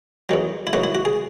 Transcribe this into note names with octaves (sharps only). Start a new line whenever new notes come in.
E2 D#3 F#3
E4
E2 D#3 F#3 F#4
E4
F#4
G#4